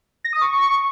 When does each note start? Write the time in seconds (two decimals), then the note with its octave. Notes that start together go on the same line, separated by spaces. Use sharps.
0.24 A#6
0.33 D#6
0.41 C#6